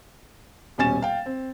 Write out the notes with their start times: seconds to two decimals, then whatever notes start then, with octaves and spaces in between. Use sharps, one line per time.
0.78 D#1 B2 C#4 G#5 A6 E7
1.02 F5 G5
1.26 C4